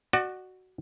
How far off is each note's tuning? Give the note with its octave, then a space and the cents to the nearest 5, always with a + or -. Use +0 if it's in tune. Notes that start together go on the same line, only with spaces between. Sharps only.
F#4 +5 D5 +35